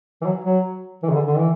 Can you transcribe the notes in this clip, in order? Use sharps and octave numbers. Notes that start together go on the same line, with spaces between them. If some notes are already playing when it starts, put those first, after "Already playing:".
E3
F#3
F#3
E3
C#3
D3
D3
E3